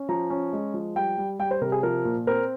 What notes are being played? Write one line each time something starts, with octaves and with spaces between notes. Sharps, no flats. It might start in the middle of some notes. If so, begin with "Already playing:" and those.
Already playing: C#4
F3 A#5
C#4
G#3
F3
G3 G5
G3
G3 G5
C5
C3 A#4
G#4
F3 A#4
A#2
C4 A#4